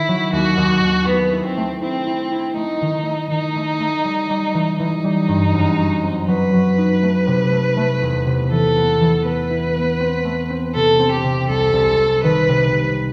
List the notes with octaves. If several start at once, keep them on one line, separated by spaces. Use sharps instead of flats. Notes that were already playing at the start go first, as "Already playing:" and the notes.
Already playing: D#3 E4
F#3
D#2 F#4
D#2
D#2
A3 B3
E4
C4
A3
C4 E4
E4
E4
A3 D#4
D#3
A3
D#3 D#4
A3
A3
G3
G3
E3
E3 D#4
G3
G2
F#2
F#3
C4
F#3 B4
F#3
D#4
A3
C3
A3
A3
E2
C3
E3 A4
B3
E3
B3 B4
E4
B3
C4
A3
C4
C3 A4
C4
G4
C3
C2 A4
C2
C2
D#3 B4
C3
C3